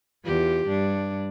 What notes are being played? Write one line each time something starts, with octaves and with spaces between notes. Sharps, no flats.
E2 F4 G4
G2 D4